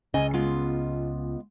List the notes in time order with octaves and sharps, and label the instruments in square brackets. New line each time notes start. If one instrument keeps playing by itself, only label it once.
[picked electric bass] C#2 C#3 [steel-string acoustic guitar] D#5 G#5
[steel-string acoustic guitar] G#3 B3 F4